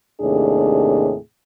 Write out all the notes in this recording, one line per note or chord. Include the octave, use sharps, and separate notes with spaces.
D#2 A2 C3 D4 G#4